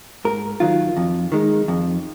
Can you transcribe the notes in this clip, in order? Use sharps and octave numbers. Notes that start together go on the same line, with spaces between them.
G#2 A#4
D#3 F#3 F4
F2
D#3 G#3
F2